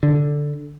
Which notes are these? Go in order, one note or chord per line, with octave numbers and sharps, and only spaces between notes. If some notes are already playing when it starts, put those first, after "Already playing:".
D3